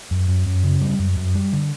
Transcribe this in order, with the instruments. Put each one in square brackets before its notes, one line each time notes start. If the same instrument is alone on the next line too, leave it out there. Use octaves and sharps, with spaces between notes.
[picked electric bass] F#2
F#2
F#2
C#3
G3
F#2
F#2
G3
D3